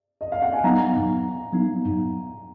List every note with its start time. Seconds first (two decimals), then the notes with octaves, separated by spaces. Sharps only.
0.21 D#5
0.32 F5
0.42 F#5
0.53 G#5
0.64 F#3 B3 D#4 A#5
1.53 F#3 B3 D#4